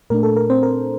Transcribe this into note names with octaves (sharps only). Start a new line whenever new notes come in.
A#2 A3 D4 A#4
A4
A#4
C4 C5
A#4